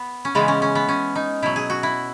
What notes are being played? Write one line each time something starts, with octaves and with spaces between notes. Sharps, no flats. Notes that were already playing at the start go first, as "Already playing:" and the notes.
Already playing: B3
C#4
C#3 E3 G#3 B3
C#4
C#4
B3
C#4
D#4
B2 F#3 E4
G#4
F#4
E4